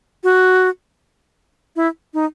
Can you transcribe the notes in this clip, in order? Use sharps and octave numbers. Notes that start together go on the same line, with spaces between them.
F#4
E4
D#4